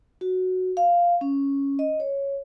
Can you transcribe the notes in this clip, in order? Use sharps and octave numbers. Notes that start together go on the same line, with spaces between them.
F#4
F5
C#4
D#5
C#5